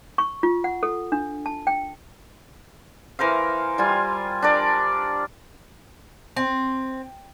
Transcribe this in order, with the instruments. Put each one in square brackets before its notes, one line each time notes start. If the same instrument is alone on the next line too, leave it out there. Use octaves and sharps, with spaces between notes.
[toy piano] C#6
F4
F#5
A4
D4
A5
G5
[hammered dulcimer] E3 A#4 C5 F5
G3 F4 G#5
D4 A#4 D5
[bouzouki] C4